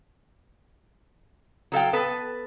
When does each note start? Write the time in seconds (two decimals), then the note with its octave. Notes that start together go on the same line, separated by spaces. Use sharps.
1.72 F#3 A4 F5 G5
1.93 B3 A4 B4